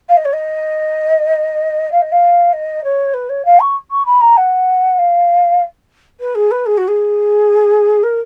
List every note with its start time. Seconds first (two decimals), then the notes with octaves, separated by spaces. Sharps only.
0.09 F5
0.17 D#5
0.25 C#5
0.33 D#5
1.91 F5
2.01 D#5
2.12 F5
2.53 D#5
2.84 C#5
3.13 B4
3.29 C#5
3.45 F5
3.60 C#6
3.91 C#6
4.06 B5
4.21 A#5
4.37 F#5
4.98 F5
6.20 B4
6.35 G#4
6.51 B4
6.66 G#4
6.77 F#4
6.87 G#4
8.03 A#4